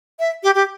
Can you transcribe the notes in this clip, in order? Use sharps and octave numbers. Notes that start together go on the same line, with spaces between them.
E5
G4
G4